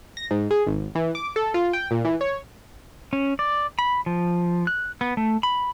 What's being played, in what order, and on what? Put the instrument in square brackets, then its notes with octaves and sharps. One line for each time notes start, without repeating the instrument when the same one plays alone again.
[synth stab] A#6
G#2
G#4
G#1
E3
D6
A4
F4
G5
A#2
E3
C#5
[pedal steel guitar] C#4
D5
B5
F3
F#6
B3
A3
B5